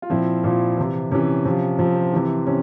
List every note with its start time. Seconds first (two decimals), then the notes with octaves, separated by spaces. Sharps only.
0.02 F4
0.10 A#2 F3 C4 E4
0.44 A#2 F3
0.78 C3 E3
1.11 C3 E3 C#4
1.45 C3 F3
1.79 C3 F3 C4
1.96 C4
2.13 C3 E3
2.47 C3 C#4